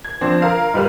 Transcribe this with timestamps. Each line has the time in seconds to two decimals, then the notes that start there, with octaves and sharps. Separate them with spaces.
0.04 G#6
0.21 F3 C4 D4
0.42 A#4 F5
0.74 G#2 G3 B4 F6